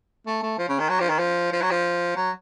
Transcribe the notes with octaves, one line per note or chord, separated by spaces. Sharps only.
A3
A3
F3
C#3
D#3
F#3
F3
D#3
F3
F3
F#3
F3
F#3